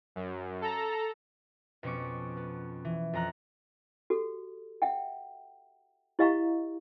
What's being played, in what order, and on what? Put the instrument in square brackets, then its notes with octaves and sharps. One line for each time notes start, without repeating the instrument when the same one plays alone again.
[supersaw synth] F#2
A4 A#5
[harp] F2 B2 C#4 C#6 D6
B3
E3
F2 A#5 F#6
[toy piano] F#4 G4 A4
E5 F#5 G5
E4 G4 D#5 F5 A#5 C#6